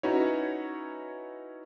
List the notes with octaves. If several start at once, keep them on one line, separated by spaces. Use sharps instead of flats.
C#4 D#4 E4 F#4 B4 C#5